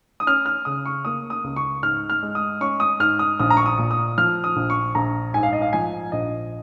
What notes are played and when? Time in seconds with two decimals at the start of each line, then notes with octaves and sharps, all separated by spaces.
0.20 D#6
0.27 C#4 F6
0.46 F6
0.65 C#3 D#6
0.86 C#6
1.05 A#3 D#6
1.30 D#6
1.44 C#2
1.56 C#6
1.83 G#2 F6
2.10 F6
2.23 G#3
2.35 D#6
2.61 C#4 C#6
2.80 D#6
2.99 G#2 F6
3.19 D#6
3.39 A#1 D#6
3.50 A#5
3.57 C#6
3.66 D#6
3.78 A#2
3.91 D#6
4.18 F3 F6
4.44 D#6
4.56 A#1
4.70 C#6
4.95 A#1 A#5
5.34 G#2 G#5
5.43 F5
5.53 D#5
5.62 F5
5.73 F3 G#5
6.12 A#1 D#5